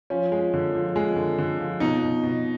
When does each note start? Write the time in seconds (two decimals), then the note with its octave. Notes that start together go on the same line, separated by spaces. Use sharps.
0.10 F3 C#4
0.32 G#3
0.54 D3
0.74 F3
0.96 G#3
1.16 D3
1.38 D3
1.59 F3
1.80 B2 D#4
2.02 B2
2.23 B2